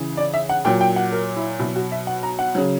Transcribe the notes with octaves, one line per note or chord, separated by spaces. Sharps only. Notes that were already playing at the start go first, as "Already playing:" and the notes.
Already playing: C#3 E3
D5
E5
F#5
A#2 F#3 G5
G5
F#5
A#4
E4
B2 F#3 E4
F#4
E5
F#5
A#5
F#5
C#3 F#3